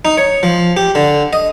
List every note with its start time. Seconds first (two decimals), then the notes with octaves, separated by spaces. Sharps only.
0.05 D#4
0.18 C#5
0.43 F3
0.77 G4
0.95 D3
1.33 D#5